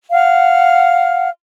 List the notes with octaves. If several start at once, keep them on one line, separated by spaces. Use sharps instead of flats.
F5 F#5 F6